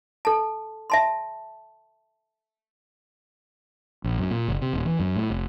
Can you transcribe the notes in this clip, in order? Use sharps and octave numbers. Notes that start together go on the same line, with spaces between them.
A4 A5
E5 A5 C6
A#1
F#2
A#2
F#1
C3
D#1
E3
F#2
A2
F1